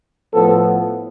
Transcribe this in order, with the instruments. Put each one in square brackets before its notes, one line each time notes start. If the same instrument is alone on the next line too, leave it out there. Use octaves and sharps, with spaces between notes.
[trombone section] A2 F3 B3 A4